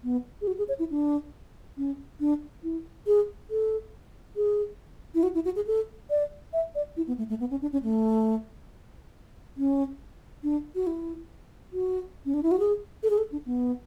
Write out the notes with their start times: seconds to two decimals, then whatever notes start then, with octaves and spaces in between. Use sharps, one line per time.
0.04 B3
0.41 G#4
0.47 F#4
0.58 G#4
0.68 C#5
0.79 E4
0.90 D4
1.77 C#4
2.20 D4
2.64 E4
3.07 G#4
3.50 A4
4.36 G#4
5.15 E4
5.23 F#4
5.35 E4
5.45 F#4
5.56 G#4
5.67 A4
6.10 D5
6.53 E5
6.75 D5
6.97 E4
7.07 B3
7.18 A3
7.29 A3
7.40 B3
7.51 C#4
7.62 D4
7.72 C#4
7.83 A3
9.57 C#4
10.43 D4
10.75 F#4
10.87 E4
11.73 F#4
12.26 C#4
12.34 D4
12.43 E4
12.51 F#4
12.59 G#4
13.03 A4
13.10 G#4
13.18 A4
13.32 D4
13.46 B3